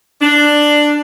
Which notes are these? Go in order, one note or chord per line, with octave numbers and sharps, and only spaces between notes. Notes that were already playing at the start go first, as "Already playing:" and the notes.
D4